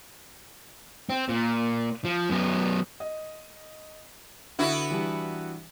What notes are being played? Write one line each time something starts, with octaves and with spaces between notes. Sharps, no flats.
C4
A#2
F3
F#2 B3
D#5
D3 B3 E4 F#4
E3 G3 D4